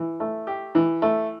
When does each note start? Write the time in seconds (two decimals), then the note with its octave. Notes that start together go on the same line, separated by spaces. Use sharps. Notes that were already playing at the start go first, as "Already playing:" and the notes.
Already playing: E3
0.20 A3
0.47 G4
0.75 E3
1.02 A3